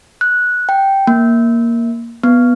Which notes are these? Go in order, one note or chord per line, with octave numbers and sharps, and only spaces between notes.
F#6
G5
A#3
B3